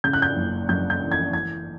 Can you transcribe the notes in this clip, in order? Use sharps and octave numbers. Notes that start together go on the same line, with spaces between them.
C#3 G6
F#6
G6
F#1
F#2 G6
G6
E3
G#6
E3 G#6